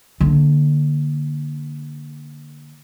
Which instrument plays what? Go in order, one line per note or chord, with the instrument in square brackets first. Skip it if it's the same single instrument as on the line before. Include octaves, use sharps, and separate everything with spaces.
[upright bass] D3 A#3